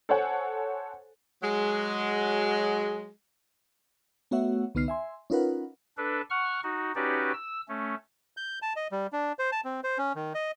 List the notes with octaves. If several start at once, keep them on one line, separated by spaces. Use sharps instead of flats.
A4 C5 C#5 F#5 G#5
F#3 G#3
A3 B3 F#4 C#5 E5 F#5
C2 D3 B3 D#4 F6 C7
E5 G#5 C6
C#4 D#4 F4 A#4 B4 F#5
D4 A4 B4
F#5 C#6 F6
D#4 F#4
C#4 D#4 F#4 G4 B4 D5
E6
A3 C#4
G6
A5
D#5
G3
D4
C5
A5
C4
C5
C#4
D#3
D#5